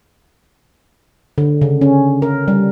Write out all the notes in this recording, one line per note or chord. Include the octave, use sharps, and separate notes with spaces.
D3
C#3
C#4
A#4
G3